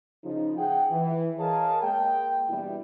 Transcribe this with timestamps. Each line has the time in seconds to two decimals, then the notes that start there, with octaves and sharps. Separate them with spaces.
0.24 C#3 F3 D#4
0.57 G#4 F#5 G5
0.91 E3
1.39 G#4 A#4 C#5 D#5 F5 A5
1.82 G#3 A#3 G5
2.49 E2 G2 B2 G3 E4